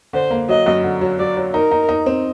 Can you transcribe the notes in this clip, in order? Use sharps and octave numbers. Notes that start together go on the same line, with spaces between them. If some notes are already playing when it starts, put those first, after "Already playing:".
D3 C5
A#3
F#3 D#5
F#2
D3
F#3
F#3 D5
F#3
D#4 A#4
D#4
D#4
C4